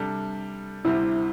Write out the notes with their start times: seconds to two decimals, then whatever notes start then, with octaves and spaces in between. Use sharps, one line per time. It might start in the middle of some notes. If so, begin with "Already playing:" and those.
Already playing: C3 G3 D4 A4
0.85 D2 C3 G3 C4 E4